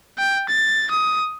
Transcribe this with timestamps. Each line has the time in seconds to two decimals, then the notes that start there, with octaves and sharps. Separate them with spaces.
0.18 G5
0.49 A6
0.91 D#6